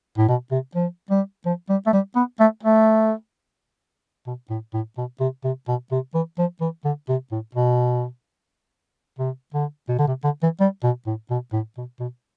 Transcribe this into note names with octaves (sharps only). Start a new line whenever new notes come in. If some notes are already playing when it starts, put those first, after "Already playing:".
A2
B2
C3
F3
G3
F3
G3
A3
G3
B3
A3
A3
B2
A2
A2
B2
C3
C3
B2
C3
E3
F3
E3
D3
C3
A2
B2
C3
D3
B2
D3
C3
D3
E3
G3
B2
A2
B2
A2
B2
B2